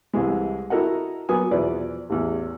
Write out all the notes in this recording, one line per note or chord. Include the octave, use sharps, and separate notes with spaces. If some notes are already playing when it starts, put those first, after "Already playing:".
C2 C3 E3 G#3
E4 F#4 A4 A#4 D#5 F#5
F#3 A#3 B3 G#5 D#6
E2 B2 F3 E4 B4 D5
A1 E2